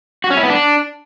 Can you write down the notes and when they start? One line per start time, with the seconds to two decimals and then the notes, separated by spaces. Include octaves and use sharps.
0.24 F#4
0.30 C#4
0.37 E4
0.43 B3
0.50 D4